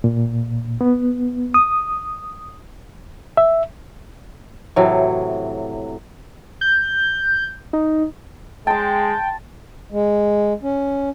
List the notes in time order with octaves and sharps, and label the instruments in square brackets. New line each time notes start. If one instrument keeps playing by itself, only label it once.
[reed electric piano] A#2
B3
D#6
E5
[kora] A2 C3 E3 F#3
[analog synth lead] G6
D#4
[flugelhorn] G#3 [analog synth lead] G5 [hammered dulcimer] A5 C6
[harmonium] G#3
C#4